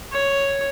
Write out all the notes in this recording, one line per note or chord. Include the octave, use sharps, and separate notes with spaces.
C#5